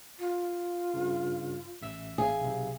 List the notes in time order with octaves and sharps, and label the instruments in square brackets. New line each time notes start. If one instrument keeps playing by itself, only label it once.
[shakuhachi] F4
[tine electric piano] G2 C#3
A1 E5 E6
[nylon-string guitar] G#4 [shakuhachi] F5
[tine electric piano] B1 C3